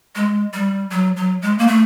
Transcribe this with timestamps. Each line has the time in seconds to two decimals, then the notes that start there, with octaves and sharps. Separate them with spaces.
0.15 G#3
0.53 G3
0.91 F#3
1.16 F#3
1.42 G#3
1.58 A#3
1.67 A3